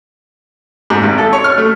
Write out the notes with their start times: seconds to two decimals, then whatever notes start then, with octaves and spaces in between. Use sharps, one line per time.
0.90 G#2
1.03 G#1
1.18 A4
1.33 C#5
1.44 F6
1.58 A3